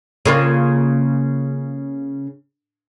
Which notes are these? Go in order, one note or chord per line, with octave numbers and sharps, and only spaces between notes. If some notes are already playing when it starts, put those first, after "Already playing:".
C#3 A#3 F4